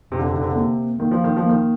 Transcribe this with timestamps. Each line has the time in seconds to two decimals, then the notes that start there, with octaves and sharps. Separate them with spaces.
0.11 F2 C3
0.19 D3
0.27 C3
0.34 D3
0.41 C3
0.49 D3
0.55 C3 A#3
0.99 D#3 A#3
1.11 F3
1.24 D#3
1.37 F3
1.43 A#3
1.49 D#3